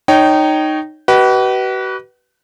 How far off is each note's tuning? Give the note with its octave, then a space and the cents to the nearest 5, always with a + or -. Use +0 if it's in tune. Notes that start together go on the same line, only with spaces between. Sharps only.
D#4 -15 C#5 +0 G5 -15
F#4 +45 B4 -10 D#5 +0